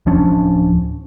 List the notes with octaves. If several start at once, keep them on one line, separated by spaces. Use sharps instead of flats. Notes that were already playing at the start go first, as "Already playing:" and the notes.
D1 F3 C#4 D4